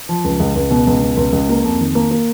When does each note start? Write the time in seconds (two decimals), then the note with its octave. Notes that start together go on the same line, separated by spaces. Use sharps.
0.09 F3
0.24 C#2
0.40 C#2
0.55 C#2
0.71 B2
0.87 C#2
1.02 B2
1.17 C#2
1.33 C#2
1.49 A#3
1.64 F2
1.79 D#3
1.95 A#3
2.11 A#3